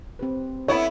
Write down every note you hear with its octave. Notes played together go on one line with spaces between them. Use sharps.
C4 G4 B4
B3 E4 A4 C#5 B5